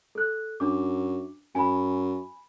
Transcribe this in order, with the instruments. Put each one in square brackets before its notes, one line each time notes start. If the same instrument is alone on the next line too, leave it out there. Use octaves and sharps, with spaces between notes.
[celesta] A4 F#6
[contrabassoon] F#2 [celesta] D4 D6
[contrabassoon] F#2 [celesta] G#5 B5